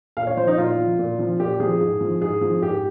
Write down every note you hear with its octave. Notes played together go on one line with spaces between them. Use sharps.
A#2 F5
C#5
F3 C5
D#4
A#2 F4
F3
A#2
F3
A#2 G4
F3 G#4
G#2
F3
G#2 G#4
F3
G#2 G4